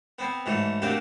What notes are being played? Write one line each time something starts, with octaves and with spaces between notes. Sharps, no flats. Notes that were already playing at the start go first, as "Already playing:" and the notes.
B3 C4
G#2 E3 F#3 A3
A3 A#3 C4 D4 F#4 G4